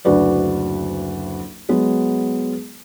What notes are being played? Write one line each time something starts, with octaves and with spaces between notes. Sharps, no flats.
F#1 D2 F#4 B4 D5
F#3 G#3 B3